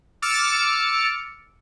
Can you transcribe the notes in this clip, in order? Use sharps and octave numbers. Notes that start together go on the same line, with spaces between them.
D6 E6 F6 A6 C#7